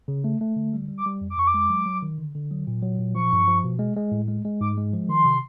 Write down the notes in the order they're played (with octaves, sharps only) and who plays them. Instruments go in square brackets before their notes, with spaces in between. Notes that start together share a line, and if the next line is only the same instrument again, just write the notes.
[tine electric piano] C#3
A3
A3
D3
G3
G3
[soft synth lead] D6
[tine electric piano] G3
F2
[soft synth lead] D6
[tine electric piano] F2 [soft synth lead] C#6
[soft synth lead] D6
[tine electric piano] G#3
F#3
F#3
D#3
D3
D3
F#3
A#2
F#3
A#2
[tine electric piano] F3 [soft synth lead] C#6
[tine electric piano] G2
F3
B2
G#3
G#3
A2
G#3
G#3
[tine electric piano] G#2 [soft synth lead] D6
[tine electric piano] G#3
F3
[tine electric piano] D#3 [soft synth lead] C6
[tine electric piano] C3